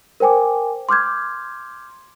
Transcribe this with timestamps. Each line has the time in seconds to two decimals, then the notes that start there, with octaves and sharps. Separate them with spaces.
0.20 A#4 C5 G5 G#5 D6
0.89 C6 D6 F6 G6 G#6